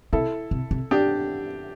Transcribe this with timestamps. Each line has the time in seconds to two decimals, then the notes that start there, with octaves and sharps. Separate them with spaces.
0.13 C3 E4 A4
0.51 C3
0.71 C3
0.91 D4 G4